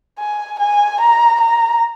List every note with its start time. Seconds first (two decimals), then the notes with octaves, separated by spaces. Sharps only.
0.19 G#5
0.59 G#5
1.00 A#5
1.40 A#5